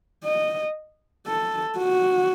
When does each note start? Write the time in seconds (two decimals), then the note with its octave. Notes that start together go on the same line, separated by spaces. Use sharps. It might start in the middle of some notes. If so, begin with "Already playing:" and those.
0.24 D#5
1.27 A4
1.78 F#4